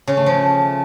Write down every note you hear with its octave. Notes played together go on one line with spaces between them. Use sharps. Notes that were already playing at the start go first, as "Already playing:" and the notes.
C#3
A3
F3